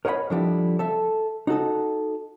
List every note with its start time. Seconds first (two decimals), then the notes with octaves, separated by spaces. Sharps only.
0.05 A#4 C#5 D#5 F#5 B5
0.30 D3 F3 G3 E4
0.79 A4 E5
1.47 D#4 F#4 A4 D#5